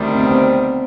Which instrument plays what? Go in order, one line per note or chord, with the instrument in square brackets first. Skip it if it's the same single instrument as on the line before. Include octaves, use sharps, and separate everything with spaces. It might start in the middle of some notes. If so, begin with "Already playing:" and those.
Already playing: [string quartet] D2 C3 D#3 G3
[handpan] C4
B3
C4